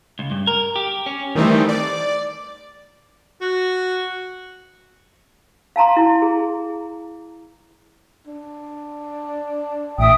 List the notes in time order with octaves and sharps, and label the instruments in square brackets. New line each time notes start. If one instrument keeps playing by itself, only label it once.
[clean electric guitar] C#2
G2
A#4
G4
C#4
[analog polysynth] D#3 E3 G3 A3 C4 D#4
D5
[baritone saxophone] F#4
[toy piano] F5 A5 A#5 C6
E4
G#4
[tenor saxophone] D4
[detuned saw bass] A1 [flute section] E5 G5 D#6